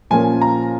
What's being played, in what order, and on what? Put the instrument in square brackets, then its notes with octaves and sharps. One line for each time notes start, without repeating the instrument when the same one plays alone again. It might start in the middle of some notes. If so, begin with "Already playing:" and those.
[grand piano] A#2 F3 A#3 C#4 G#5
A#5